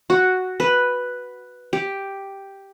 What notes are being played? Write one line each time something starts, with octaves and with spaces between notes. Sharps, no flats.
F#4
B4
G4